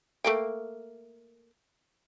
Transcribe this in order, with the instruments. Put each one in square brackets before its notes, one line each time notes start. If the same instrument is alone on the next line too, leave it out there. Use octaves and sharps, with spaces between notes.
[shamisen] A3 A#3 G5